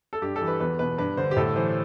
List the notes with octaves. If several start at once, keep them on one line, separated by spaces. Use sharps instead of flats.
A4
G2 G4
A4
E3
B4
E2 B4
B2 B4
G2 B4
D3 C5
G4
A2 A4
E3 C5